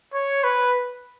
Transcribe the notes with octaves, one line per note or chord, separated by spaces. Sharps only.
C#5
B4